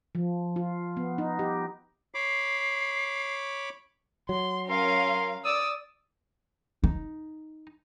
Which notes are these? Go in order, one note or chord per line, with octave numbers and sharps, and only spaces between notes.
F3
F4
B3
D#4
G4
C#5 B5 D6 C7
F#3 C6
C#4 A#4 F5 C6
D5 D#6 E6
D#4